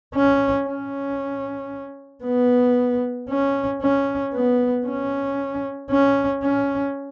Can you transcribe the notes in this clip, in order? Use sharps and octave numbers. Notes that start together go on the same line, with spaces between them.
C#4
C#4
B3
C#4
C#4
B3
C#4
C#4
C#4